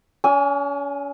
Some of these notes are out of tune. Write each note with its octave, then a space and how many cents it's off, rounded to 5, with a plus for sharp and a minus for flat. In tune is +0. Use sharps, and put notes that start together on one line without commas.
C#4 +40 G#5 +0 E6 +15